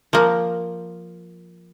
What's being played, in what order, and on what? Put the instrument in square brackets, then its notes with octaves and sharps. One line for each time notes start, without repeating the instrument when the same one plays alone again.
[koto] F3 A#3